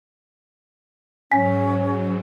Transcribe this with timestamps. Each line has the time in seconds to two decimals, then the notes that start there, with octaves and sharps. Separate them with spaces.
1.31 G#2 F#3 C#4 G#5 B6